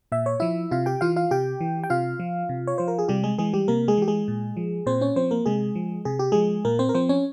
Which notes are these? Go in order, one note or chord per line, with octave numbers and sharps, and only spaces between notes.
A#2 E5
C#5
F3 E4 E5
C3 F4 F5
G4 G5
E3 F4 F5
F4 F5
C3 G4 G5
E3
G5
C3 F4 F5
F3
C3
C#5
F3 C5
A#4
G#4
C3 G3 G4
G#3 G#4
E3 G#3 G#4
G3 G4
C3 A#3 A#4
G#3 G#4
E3 G4
G#3 G#4
A#2
F3
A#2 C4 C5
C#4 C#5
F3 C4 C5
A#3 A#4
C3 G#3 G#4
F3
C3 G#4
G4
F3 G#3 G#4
A#2 A#3 A#4
C4 C5
A#4
F3 C4 C5
C#4 C#5